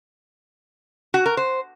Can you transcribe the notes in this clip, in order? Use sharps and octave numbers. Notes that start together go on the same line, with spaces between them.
F#4
A#4
C5